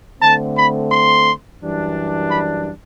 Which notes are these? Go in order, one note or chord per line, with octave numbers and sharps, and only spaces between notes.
D3 A3 C4 A5
B5
C6
F#2 E3 G3 D4
B5